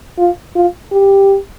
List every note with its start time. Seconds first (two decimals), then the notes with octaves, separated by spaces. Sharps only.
0.18 F4
0.55 F4
0.92 G4